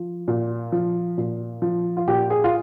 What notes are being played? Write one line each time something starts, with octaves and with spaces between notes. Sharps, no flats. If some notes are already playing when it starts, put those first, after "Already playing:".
Already playing: F3
A#2
F3
A#2
F3
F4
A#2 G4
G#4
F4